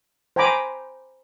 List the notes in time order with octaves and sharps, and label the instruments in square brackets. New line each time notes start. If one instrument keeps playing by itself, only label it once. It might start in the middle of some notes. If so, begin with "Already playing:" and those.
[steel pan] C5 G5 G#5 A#5 B5 D6